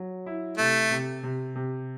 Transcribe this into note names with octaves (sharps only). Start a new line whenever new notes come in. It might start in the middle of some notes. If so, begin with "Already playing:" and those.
Already playing: F#3
E4
C3 A3
C3
C3
C3